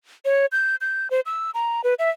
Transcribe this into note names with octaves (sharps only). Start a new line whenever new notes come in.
C#5
G6
G6
C5
E6
A#5
B4
E5